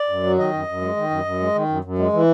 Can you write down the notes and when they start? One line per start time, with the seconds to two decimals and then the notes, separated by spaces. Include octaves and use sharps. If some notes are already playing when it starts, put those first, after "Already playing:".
Already playing: D5
0.09 F#2
0.23 F#3
0.38 D#3 D#5
0.53 F#2
0.68 F#2
0.82 G#3
0.97 D#3
1.10 F#2
1.25 F#2
1.40 G#3
1.55 D#3
1.69 F#2
1.84 F#2
1.99 G#3
2.13 E3